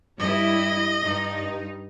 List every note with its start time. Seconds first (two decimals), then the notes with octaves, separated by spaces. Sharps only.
0.20 G2 G3 E4 D#5
1.03 G2 D#4